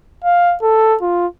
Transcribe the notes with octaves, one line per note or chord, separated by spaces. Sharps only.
F5
A4
F4